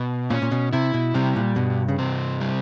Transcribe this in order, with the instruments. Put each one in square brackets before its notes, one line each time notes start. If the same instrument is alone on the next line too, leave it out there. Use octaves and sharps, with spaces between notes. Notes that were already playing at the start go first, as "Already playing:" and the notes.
Already playing: [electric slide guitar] B2
[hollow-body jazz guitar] A#2 [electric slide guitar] C#4
[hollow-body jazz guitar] A#2
B2
[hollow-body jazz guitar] C3 [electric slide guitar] E4
[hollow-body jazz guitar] B2
[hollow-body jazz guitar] C3 [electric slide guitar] G3
[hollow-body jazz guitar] A#2
[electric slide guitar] G2 [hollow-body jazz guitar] B2
[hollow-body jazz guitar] C#3
[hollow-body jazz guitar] C3 [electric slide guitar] C4
[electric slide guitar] G3